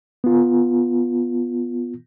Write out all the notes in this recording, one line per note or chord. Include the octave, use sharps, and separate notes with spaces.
B3 F4